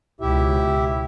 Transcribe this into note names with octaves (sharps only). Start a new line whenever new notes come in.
C#2 B2 E4 G4 E5